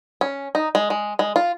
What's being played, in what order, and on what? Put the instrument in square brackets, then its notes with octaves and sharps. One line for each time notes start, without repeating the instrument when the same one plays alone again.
[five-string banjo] C#4
D#4
G#3
G#3
G#3
F4